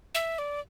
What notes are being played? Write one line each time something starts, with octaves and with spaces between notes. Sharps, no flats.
E5
D5